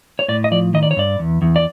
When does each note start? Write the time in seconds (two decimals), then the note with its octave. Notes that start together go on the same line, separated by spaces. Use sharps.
0.19 C#5
0.28 A2 D5
0.44 D#5
0.51 F3 D5
0.74 D#3 D#5
0.83 D5
0.91 C#5
0.96 G2 D5
1.19 E2
1.42 E2
1.56 D5